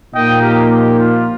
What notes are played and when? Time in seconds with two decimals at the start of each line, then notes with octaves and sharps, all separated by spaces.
0.13 A#2 F3 A#3 D#4 D#5 G5
0.42 G4 A#4
0.71 G4
0.99 F4